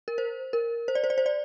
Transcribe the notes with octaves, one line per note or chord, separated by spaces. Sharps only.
A#4
C5
A#4
C5
D5
C5
D5
C5
D5